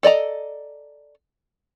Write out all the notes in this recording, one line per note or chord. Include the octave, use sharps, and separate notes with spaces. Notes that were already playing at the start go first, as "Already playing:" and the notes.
A4 D5 D#5 A#5